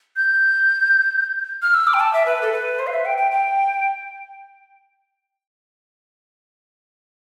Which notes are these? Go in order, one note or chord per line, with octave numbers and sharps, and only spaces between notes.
G6
F6
E6
D6
G5
A5
E5
B4
A4
B4
C5
F5
E5
G5
G5
G5